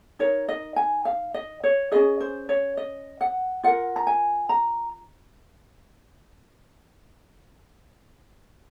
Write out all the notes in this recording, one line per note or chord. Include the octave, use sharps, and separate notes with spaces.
D#4 A#4 C#5
D#5
G#5
F5
D#5
C#5
C#4 F4 G#4 D#5
C5
C#5
D#5
F#5
F4 A#4 F#5
A#5
G#5
A#5